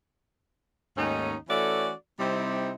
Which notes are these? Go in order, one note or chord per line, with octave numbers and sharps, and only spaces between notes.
D#2 G#2 A3 C#4 D#4
E3 A3 C#4 F#4 A4 D5
C3 G3 C4 D#4 E4